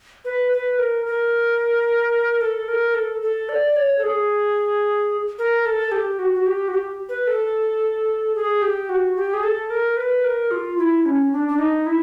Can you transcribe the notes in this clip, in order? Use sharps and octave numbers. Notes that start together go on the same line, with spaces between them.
B4
B4
A#4
A#4
A4
A#4
A4
A4
D5
C#5
A4
G#4
A#4
A4
G4
F#4
F#4
G4
F#4
G4
B4
A4
G#4
G4
F#4
G4
G#4
A4
A#4
B4
A#4
F4
E4
C#4
D4
D4
D#4
E4